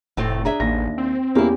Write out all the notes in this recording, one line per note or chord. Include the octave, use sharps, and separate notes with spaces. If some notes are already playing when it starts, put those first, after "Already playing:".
F1 A2 A3 C4
D4 G#4 E5 A#5
A1 D#2 A#6
C4
E2 A#3 C#4 E4 G4